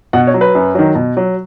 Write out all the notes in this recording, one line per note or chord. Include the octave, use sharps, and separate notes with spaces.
B2 F#5
C#5
F#3
B4
F#2
D#3 F#3
B2
F#3